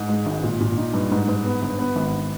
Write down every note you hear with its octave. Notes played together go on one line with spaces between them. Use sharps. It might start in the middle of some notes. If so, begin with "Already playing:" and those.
Already playing: G#2
G#3
G#1
A#2
A#2
D#4
G2
G#2
G#2
B3
G1
B3
G#1